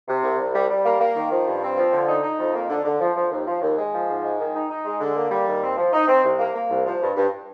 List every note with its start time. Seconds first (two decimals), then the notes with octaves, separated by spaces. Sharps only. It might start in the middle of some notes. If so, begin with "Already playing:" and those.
0.08 C3
0.23 C2
0.39 C2
0.55 G3
0.70 G3
0.85 A#3
1.01 A#3
1.16 D#3
1.31 F3
1.47 G2
1.63 C4
1.77 F3
1.92 D3
2.08 D#4
2.23 D#4
2.39 F2
2.55 A#3
2.69 D3
2.85 D3
3.00 F3
3.16 F3
3.32 D#2
3.46 F3
3.62 D#2
3.78 G#3
3.92 F3
4.08 G#2
4.24 G#3
4.39 D#3
4.54 D#4
4.70 D#4
4.85 G#3
5.01 D3
5.15 A#3
5.31 G3
5.46 D#2
5.63 C4
5.77 F3
5.93 D#4
6.08 C4
6.24 C2
6.39 A#3
6.55 A#3
6.69 C2
6.86 F3
7.00 G2
7.16 G2